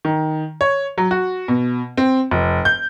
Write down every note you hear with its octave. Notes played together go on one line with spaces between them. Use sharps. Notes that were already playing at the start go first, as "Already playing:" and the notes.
D#3
C#5
F#3
F#4
B2
C4
F1
G6